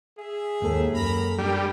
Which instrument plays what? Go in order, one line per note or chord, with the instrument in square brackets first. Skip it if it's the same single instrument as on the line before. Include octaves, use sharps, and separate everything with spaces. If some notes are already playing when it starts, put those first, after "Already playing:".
[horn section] G#4 E5
[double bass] D#2 [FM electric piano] G#2 A#3 A4
[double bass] F#2 [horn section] A#4 A#5 B5
[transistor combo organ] G3 [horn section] D4 A4 A#4